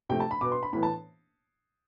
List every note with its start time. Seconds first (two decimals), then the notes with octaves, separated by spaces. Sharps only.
0.09 C3 F3 A3 G5
0.20 A5
0.31 B5
0.41 B2 B3 D6
0.52 C6
0.63 B5
0.73 A2 E3 B3 B5
0.83 A5